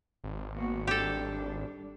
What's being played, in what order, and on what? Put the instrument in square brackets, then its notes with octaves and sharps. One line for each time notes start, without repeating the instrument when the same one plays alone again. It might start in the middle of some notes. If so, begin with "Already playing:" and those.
[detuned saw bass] G#1
[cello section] A#3 B3 F#4
[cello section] G3 D4 [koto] G4 A4